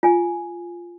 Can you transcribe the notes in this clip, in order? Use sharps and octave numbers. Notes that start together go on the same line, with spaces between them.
F4 G#5